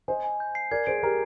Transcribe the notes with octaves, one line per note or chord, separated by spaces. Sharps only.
C5 D#5 G#5
G#5
G6
C7
A#4 D5 G#6
G#4 C5 D7
G4 A#4 A#5